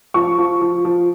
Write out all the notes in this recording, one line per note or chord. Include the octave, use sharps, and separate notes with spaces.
F3 C#6
F3
F3
F3